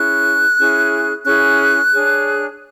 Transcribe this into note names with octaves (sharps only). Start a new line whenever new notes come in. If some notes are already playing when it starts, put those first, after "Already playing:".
Already playing: C#4 E4 G#4 F#6
C#4 E4 G#4
C#4 E4 G#4 F#6
D4 G#4 C#5